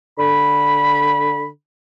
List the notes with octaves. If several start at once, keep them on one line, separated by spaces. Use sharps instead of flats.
D3 B5